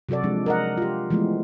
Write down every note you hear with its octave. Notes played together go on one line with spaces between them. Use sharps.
C3 F#3 F#4 A4 D5
F3 G#3 D4
A#4 D#5 F#5
F4 G4
E3 F3 G#3 A3 B3